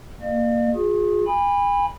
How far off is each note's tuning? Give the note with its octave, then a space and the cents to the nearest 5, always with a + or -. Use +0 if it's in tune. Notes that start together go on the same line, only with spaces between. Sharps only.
A#3 +0 D5 +45
F4 +45 G#4 +0
G#5 -40 B5 +0